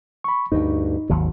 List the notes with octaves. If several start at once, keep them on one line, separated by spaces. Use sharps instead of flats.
B5 C#6
D2 G2 D#4
G#1 D#2 F#3